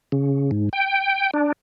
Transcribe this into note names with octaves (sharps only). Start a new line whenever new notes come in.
C#3
G#2
G5
D4